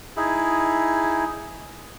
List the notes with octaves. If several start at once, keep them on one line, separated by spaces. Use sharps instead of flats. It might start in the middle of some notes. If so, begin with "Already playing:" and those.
D#4 E4 G#4